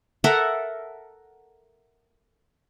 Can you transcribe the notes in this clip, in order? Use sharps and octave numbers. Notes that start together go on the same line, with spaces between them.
A4 A#4 E5 F#5